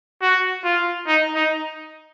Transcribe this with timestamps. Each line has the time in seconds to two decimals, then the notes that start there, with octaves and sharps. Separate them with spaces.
0.22 F#4
0.64 F4
1.07 D#4
1.35 D#4